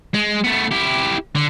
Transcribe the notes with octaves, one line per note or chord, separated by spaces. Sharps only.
G#3
A3 B3
E4 G4
D3